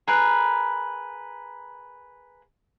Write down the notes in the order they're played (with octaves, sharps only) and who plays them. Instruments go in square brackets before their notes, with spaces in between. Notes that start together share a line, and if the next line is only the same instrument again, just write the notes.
[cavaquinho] G#4 A#4 B4